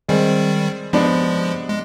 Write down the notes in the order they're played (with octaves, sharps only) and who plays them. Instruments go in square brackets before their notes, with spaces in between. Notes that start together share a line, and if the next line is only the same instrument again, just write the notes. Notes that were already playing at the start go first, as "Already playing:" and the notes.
[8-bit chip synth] D#3 G3 [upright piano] G#3 C4
[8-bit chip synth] F3 G#3 [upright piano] B3 D4
[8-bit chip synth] G#3